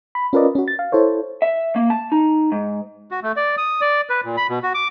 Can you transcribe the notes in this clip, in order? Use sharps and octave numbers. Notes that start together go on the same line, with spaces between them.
B5
C#4 F4 A#4 B4 D5 D#5
C#4 F#4
A6
F5
E4 A4 C5 C#5
E5
A#3
A5
D#4
G#2
F#4
A3
D5
D#6
D5
B4
A#2
B5
B2
F#4
D6